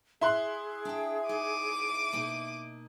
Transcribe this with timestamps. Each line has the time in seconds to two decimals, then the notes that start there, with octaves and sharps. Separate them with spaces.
0.21 E4 G#4 C6 F#6
0.85 D4 G5
1.29 D#4 D6 D#7
2.13 B2 A#3 D#4